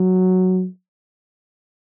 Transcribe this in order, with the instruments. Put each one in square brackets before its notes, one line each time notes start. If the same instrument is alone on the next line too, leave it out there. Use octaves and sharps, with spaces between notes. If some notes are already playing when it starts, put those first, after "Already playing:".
Already playing: [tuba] F#3